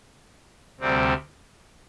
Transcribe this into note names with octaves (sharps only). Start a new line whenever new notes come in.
D2 C3 G3 C4